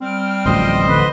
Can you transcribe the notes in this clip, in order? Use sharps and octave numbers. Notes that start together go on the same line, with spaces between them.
G3 C4 G5 F6
D1 A1 F3 C5 D#5 C6
D3 B4 B5